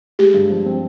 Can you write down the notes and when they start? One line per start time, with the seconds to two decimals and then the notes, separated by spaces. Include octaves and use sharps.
0.19 G#3 G4
0.34 G2
0.50 F3
0.66 C4